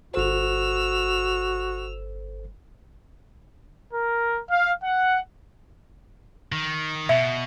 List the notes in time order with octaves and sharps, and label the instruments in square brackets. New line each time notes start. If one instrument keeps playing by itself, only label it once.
[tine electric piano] G1 A4 C5 [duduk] F#4 [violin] E6 F7
[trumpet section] A#4
F5
F#5
[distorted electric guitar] D#3
[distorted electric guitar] B2 [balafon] E5